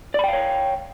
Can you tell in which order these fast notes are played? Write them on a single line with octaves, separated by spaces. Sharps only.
D5 B5 G5 F5 C#5